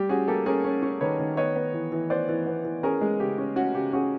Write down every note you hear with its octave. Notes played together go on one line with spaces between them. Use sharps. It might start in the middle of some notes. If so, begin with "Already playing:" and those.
Already playing: G3 G4
C#4 F#4 G#4
A#3 G4 A4
C#4 G#4 A#4
C#4
C#4
D#3 B4 C#5
D#3
B3 C#5 D#5
B3
E3
E3
B3 C5 D5
E3
B3
E3
C#4 G#4 A#4
G#3
C#3 G4
C#4
C#4 F#4
C#3 G4
C#4 F#4 G#4